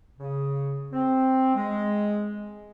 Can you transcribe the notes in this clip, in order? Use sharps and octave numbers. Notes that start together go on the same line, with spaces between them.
C#3
C4
G#3